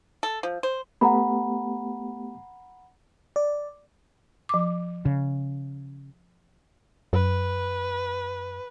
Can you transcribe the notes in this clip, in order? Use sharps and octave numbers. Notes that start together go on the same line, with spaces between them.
A4
F3
C5
A3 B3 G4 F#5 A#5 B5
D5
F3 D6
C#3
F#2 B4